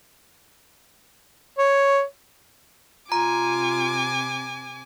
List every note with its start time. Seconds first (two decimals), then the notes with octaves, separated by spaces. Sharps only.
1.58 C#5
3.12 C3 F4 G#5 A#5 D6